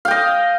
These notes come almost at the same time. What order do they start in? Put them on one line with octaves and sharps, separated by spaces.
F5 G5 D#5